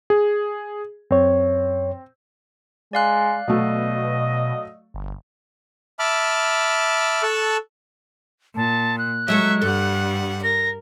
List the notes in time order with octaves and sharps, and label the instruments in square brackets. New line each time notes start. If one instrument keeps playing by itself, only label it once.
[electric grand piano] G#4
[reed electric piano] F#2 C#5 [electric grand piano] C4
[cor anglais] G#3 [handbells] D5 F5 F#6
[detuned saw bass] B2 [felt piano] F#3 A3 [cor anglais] D#5
[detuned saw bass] G1
[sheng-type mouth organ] E5 A5 B5 D6 F6
A4 A5 C#6 E6 F#6
[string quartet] A#2 [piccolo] A5
[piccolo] F#6
[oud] F#3 G#3 A4 [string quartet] E5 C#6
[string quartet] G2 G3 F#5 [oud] A4
[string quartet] A#4 [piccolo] A#6